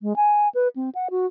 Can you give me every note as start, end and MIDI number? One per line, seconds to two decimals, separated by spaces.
0.01 0.16 56
0.16 0.48 80
0.55 0.68 71
0.76 0.90 60
0.95 1.08 78
1.10 1.26 66